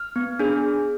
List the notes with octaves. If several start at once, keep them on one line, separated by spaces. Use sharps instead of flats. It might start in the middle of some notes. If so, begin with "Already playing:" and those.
Already playing: F6
B3
D4 G#4